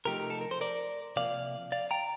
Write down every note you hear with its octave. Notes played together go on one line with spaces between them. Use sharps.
C3 F3 A3 D#4 G4 A#4
G4
A4
A#4
C5
A#4 D5
C3 F3 A#3 D5 F5
D5 F5
G5 A#5